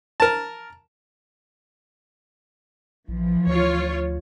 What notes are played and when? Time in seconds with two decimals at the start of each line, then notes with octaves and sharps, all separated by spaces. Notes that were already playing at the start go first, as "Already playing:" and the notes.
0.20 A#4 A5
3.08 A#1 E3 F3
3.47 D2 F4 C#5